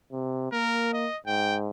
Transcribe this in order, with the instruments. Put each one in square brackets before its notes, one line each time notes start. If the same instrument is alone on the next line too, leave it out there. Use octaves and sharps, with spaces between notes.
[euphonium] C3
[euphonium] A#3 [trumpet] A#4
[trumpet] D#5
[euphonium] G#2 [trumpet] G5